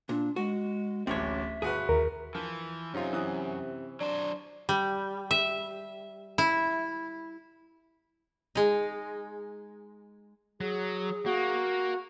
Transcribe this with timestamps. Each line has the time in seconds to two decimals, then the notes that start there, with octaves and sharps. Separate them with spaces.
0.09 A#2 D4
0.36 G#3 F#4
1.07 D1 A1 C4 C#4 C#5 E5
1.62 G1 F#4 G#4 B4
1.89 D#2 A#4
2.35 E3 F3
2.94 F#2 C3 C#4 D#4 F4
3.13 E3 C#4 D#6
4.00 F#3 D4 C5
4.69 G3
5.31 E5
6.38 E4
8.55 G#3 D#4
10.61 F#3 G#4
11.26 A#3 F#4